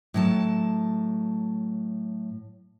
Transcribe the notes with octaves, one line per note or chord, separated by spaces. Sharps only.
A2 F#3 A5